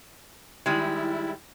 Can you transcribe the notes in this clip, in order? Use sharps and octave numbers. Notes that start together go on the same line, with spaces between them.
D#3 G3 G#3 E4